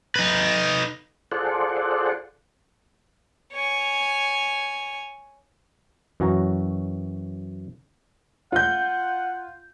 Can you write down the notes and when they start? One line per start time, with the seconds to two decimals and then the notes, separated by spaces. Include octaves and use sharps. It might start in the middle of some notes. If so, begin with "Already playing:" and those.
0.16 D#4 B4
1.32 F4 G#4 A4 C5 D5 F#5
3.53 C#5 G#5
6.20 F#2 E3 F#4 C#5 A#5
8.52 F4 F#5 G6